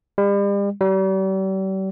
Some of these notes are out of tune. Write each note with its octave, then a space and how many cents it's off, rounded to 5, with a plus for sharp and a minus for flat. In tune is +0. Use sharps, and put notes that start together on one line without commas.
G3 +40
G3 -40